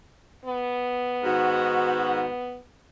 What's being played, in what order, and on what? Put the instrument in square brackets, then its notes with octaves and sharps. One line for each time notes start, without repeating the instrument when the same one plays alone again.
[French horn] B3
[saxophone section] G#2 D#3 F#4